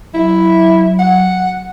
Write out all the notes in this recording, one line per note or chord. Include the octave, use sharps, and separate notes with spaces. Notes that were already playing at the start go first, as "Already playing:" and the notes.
F#3 E4
F#5